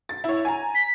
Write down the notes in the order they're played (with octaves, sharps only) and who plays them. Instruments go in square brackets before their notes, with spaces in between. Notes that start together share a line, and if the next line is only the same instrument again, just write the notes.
[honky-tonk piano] A6
E4 C#5
G#5 A#5
[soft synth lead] B6